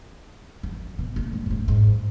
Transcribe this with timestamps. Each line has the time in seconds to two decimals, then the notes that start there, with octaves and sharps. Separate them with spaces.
0.63 E3
0.98 B2
1.16 A#2
1.33 G#2
1.46 G#2
1.50 A2
1.68 G#2